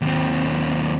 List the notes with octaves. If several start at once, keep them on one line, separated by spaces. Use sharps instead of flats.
D#2 C4